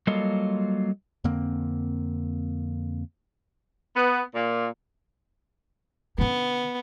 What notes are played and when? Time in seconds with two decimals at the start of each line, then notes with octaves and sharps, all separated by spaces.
0.07 F#3 G3 A#3 F4 A4 D#5
1.24 F2 D3 A#3 C4
3.96 B3
4.35 A#2
6.18 D3 B3 C#4